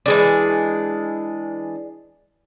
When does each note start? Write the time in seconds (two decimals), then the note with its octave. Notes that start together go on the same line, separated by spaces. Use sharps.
0.06 E3 G#3 D4